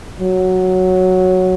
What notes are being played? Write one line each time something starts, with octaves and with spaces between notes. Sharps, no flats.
F#3